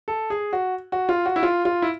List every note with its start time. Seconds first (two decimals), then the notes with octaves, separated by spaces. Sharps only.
0.08 A4
0.30 G#4
0.53 F#4
0.92 F#4
1.09 F4
1.26 F#4
1.36 E4
1.43 F4
1.65 F4
1.82 E4